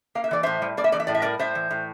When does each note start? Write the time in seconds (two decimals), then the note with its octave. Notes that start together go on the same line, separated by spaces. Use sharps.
0.15 A#3 F5
0.24 E5
0.31 E3 D5
0.43 A2 C5 E5
0.62 G3
0.77 A#3 D5
0.84 E5
0.92 E3 D5
1.00 E5
1.07 A2 D5
1.15 E5
1.22 G3 A#4 D5
1.39 A2 C5 E5
1.55 E3
1.71 A2